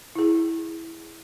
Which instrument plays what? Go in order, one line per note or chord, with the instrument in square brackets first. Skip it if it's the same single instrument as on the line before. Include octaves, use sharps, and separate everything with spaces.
[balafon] E4 G#4